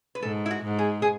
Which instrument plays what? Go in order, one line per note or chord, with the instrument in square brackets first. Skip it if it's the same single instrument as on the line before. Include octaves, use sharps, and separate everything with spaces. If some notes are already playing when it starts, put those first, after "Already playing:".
[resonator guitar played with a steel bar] B4
[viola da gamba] G#2 [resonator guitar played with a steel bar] A4
[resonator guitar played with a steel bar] E4
F#4
[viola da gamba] G#2
[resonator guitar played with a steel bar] G#4
G#4